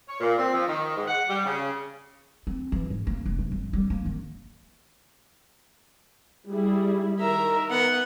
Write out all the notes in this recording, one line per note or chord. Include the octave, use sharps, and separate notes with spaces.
C#5
A#2
C4
F3
D#3
G#2
F#5
G3
C#3
C4
E3
G#2
A#3
F1
E3
G1
G3
A#3
D#3
G3 E4 G#4
D#3 A#4 E5 A#5
B3 F#5